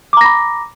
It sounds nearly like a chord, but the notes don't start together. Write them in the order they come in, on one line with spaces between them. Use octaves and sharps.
D6 A#5 A#6 B5